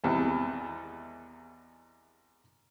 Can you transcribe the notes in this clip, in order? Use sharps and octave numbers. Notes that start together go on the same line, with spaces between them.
G#1 E2 C3 G3 E4 A4